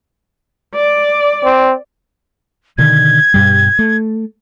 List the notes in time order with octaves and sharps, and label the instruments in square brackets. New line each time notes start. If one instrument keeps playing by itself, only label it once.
[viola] D5
[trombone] C4
[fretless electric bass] B2 D3 D#3 [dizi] G#6
[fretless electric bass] G2 B2 G3
A3